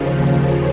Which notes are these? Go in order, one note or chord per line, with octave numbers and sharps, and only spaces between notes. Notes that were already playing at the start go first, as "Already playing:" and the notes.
Already playing: D#2 C#3 F3
A#4